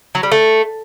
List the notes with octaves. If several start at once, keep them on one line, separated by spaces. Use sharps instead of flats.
F#3
G3
A3